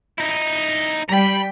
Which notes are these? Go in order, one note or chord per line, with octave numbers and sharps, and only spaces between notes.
D#4 E4
G3 G5 A#5 B5 B6